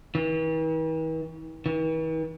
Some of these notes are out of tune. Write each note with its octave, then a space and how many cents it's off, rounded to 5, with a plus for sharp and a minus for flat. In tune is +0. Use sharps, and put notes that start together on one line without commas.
E3 -45
E3 -45